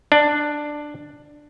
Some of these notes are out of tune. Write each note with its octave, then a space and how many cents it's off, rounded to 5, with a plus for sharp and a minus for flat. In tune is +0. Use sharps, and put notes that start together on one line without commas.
D4 +10